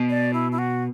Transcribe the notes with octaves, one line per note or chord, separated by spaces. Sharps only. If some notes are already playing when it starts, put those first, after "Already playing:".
Already playing: B2
D5
E4
E4
F#4